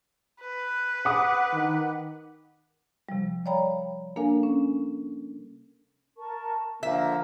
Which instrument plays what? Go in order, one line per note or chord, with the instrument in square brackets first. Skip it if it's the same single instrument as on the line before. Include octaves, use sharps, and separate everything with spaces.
[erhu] B4
[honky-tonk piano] F#5 D6 D#6
[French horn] D#3
[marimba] C3 F3 G3
C#5 D5 F5 G5 A#5 B5
A#3 D4 A4 A#4 F5 G#5
C#4
[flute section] A#4 A5 C#6
[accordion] D3 F3 [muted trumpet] A#3 [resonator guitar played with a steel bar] E5 [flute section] E6